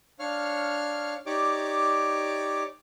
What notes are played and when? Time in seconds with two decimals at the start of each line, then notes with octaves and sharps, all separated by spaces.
0.19 D4 C#5 F5 F6
1.26 D#4 G4 C#5 D5 D6